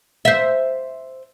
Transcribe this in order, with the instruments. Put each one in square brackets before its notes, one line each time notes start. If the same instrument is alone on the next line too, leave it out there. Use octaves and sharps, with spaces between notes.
[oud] C5 E5